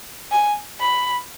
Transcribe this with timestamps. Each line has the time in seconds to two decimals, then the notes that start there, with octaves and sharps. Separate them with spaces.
0.32 G#5
0.80 B5